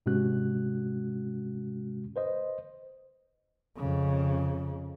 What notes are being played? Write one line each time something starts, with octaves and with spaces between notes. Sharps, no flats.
G#2 C3 G#3 C#4 F#4 F#6
B4 C5 D#5
F2 C#3